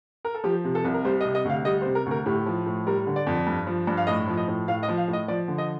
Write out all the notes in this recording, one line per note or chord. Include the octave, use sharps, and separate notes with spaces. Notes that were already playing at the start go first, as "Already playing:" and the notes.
A#4
A4
F3 G4
C3
A4
C2
A#4
G3 C5
D#5
C3
D#5
D2 F5
G3 D#5
C5
C3
A#4
D2
A#4
A2 G4
F3
A2
G3 A#4
D3
D5
F2
G2
F3
G2
F5
A2 D#5
F3
D#5
A2
A2 F5
D#5
F3
F5
A2
D#5
F3 D5
D3
D#5